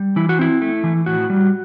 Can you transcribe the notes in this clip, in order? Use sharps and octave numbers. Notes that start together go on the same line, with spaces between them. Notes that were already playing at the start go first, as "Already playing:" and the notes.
Already playing: G3
E3 E4
F#4
C4 E4
A3
E3
A2 F#4
G3